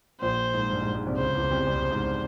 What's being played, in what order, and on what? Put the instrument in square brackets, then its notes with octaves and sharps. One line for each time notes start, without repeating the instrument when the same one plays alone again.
[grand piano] A#1 A#2 [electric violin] C5
[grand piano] G#2
G2
G#2
G#2
C2 C3
[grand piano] C#2 C#3 [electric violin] C5
[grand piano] E2 E3
C2 C3
C2 C3
G#2